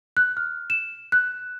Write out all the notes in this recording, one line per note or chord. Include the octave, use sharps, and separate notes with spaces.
F#6
F6
E7
F#6